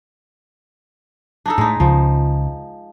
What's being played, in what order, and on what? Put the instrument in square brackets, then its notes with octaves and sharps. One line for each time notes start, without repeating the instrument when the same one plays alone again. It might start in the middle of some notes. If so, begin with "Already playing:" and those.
[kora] D4 D#4 A4
[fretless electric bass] A2 [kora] G#3 D#4
[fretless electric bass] C#2 C#3 [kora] F3